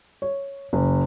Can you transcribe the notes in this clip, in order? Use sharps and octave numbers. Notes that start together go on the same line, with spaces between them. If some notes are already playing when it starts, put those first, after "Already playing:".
C#5
F#1